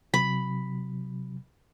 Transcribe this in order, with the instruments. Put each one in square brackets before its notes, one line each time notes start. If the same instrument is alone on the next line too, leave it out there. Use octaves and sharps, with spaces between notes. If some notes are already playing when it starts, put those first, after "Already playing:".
[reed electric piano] C3 F#3 [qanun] B5